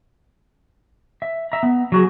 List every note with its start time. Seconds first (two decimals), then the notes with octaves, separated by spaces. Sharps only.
1.22 E5
1.52 E5 A#5
1.63 B3
1.92 F#3 F#4 G#4